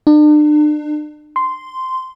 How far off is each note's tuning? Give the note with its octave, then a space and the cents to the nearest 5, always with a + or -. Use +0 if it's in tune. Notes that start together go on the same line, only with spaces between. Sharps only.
D4 +40
C6 -10